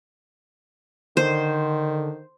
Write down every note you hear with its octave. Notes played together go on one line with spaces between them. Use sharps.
D3 D#3 C5